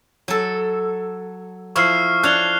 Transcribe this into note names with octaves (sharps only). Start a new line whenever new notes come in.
F#3 A4
F3 E4 F5 C#6 F6 C7
D4 C#5 F#6 F7 G7